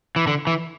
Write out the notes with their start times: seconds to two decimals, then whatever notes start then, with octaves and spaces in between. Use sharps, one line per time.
0.16 E3
0.27 D3
0.47 E3